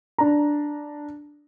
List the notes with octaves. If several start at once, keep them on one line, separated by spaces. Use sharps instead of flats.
D4 A#5